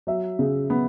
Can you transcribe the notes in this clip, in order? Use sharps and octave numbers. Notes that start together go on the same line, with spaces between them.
F#3 E5
C#3
B3